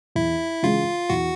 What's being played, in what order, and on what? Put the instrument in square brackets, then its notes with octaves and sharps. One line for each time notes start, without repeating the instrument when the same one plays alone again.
[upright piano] E2 [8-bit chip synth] E4
[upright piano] C#3 E3 G#3 C#4 [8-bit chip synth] F4
[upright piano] E2 [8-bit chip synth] F#4